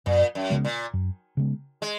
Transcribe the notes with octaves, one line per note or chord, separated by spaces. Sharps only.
F#2 A#2
F#2
C#3 G#3 B3
A#2
F#2
C#3 G#3 B3
G#3